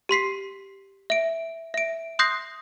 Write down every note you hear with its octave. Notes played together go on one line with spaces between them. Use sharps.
G4 C6 B6 C7
E5 D7
E5 D7
C6 D#6 F#6 G6 A#6 C7